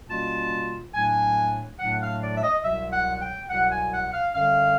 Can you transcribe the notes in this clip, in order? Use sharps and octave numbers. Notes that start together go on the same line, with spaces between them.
B2 G3 A#3 C#4 F4 A5
A2 F#3 A3 D4 G#5
A2 F#3 A3 D4 F#5
F5
D5
E5
D#5
C2 B2 F#3 E5
F#5
G5
C2 B2 F#3 F#5
G#5
F#5
F5
F#2 D3 G3 F5